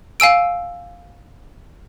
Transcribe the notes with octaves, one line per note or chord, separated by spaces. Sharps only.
F5 G#5 E6 D7